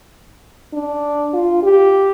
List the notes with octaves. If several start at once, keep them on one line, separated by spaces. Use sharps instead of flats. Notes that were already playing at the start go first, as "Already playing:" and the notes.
D4
F4
G4